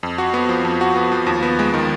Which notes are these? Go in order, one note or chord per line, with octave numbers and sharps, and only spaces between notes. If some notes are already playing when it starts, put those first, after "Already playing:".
F2
F#4
B3
F3
F2
F#4
B3
F3
D#2
B3
G#3
D#3